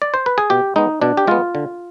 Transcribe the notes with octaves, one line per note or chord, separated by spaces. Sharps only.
D5
C5
B4
G#4
B2 G4
G#3 B3 D#4
B2 D4
G4
G#3 B3 F4
D3